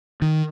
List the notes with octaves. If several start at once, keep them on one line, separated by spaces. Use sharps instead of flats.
D#3